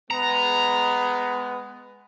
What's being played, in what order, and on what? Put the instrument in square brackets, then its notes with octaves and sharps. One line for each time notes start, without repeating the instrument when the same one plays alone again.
[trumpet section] G#3 B3 [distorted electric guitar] A#5